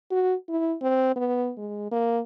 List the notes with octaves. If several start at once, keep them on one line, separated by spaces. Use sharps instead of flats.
F#4
E4
C4
B3
G#3
A#3